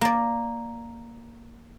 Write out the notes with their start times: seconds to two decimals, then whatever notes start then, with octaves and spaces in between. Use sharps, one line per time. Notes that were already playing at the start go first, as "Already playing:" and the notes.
0.01 A#3 D5